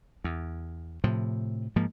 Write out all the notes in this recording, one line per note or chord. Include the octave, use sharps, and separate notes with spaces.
E2
A2 C3 F3
G#2 F3 A#3